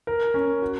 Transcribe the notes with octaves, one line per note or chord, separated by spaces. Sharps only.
A#4
C#4
F#4